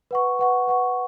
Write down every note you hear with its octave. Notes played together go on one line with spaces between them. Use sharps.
B4 F#5 C#6
B4 F#5 C#6
B4 F#5 C#6